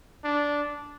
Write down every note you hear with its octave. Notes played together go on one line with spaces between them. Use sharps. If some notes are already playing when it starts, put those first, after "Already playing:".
D4